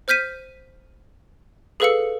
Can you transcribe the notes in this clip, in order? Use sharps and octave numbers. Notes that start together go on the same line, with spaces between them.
C5 F6 G6 B6 D#7
G#4 A4 B4 F5 E6 C#7